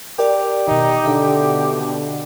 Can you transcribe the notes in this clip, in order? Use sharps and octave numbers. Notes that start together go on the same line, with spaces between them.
G4 A#4 D5
B2 D#3 D#4
D3 E5
B2
D3